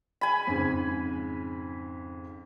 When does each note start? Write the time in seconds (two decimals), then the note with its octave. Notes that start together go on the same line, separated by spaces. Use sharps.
0.21 G#5 B5
0.47 F2 G#2 C#3